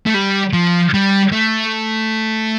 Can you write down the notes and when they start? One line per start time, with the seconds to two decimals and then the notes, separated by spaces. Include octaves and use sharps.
0.06 A3
0.14 G3
0.53 F3
0.94 G3
1.32 A3